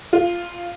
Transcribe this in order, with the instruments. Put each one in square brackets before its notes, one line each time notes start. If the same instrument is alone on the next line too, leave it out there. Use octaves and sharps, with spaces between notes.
[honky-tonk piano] F4